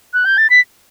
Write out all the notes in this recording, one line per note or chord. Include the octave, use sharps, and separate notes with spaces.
F#6
G6
A6
B6